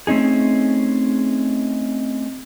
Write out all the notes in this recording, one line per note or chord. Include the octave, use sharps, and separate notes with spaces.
A3 C4 C#4 D#4 G#4